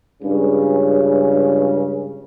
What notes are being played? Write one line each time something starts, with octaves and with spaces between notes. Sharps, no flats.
C#2 G2 C#3